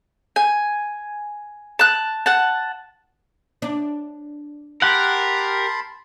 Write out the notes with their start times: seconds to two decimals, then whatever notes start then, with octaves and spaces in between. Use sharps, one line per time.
0.36 G#5
1.79 A5 F#6
2.26 F#5 A5
3.62 D4
4.82 G4 A#4 F#5 A5 B5 C6